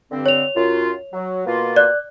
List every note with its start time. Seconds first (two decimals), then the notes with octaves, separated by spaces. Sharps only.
0.11 G2 D3 C4
0.26 C#5 F7
0.55 F#2 F4
1.13 F#3
1.46 B2 A#3 F4
1.76 D5 F#6